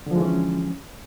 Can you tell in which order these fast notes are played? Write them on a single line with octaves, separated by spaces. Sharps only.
D3 F3 G#3 E3 C#4